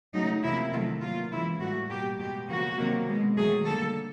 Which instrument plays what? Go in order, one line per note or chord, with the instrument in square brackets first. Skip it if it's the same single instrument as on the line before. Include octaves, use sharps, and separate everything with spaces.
[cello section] C#3 F#3 A3 D#4
C3 F3 A#3 E4
C3 D#3 F#3 A3 F4
B2 F#3 A#3 F4
C#3 E3 G#3 E4
A2 E3 G3 A#3 F#4
B2 G3 A#3 G4
B2 G#3 G4
C#3 F3 A#3 F#4
C3 D#3 F#3 A#3
B2 G#3
D#3 F#3 A3 G#4
D3 G3 A#3 A4